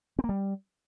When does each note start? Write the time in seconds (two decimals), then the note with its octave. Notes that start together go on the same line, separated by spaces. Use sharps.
0.19 C4
0.24 A#3
0.29 G3